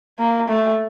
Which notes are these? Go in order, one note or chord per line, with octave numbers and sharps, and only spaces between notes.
A#3
A3